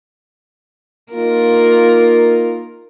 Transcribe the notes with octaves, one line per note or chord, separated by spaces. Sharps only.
A#3 D#4 F4 A#4